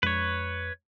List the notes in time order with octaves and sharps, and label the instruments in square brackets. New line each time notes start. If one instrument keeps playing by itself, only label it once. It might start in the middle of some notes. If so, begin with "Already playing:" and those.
[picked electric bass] F2 G#3 D4 [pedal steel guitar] B4 C#5